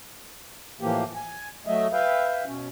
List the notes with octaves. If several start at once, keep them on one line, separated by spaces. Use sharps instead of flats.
A2 E3 F3 A#3 G4
G#5
F#3 A3 D#5 E5
B4 E5 F5 G5
B2 C#4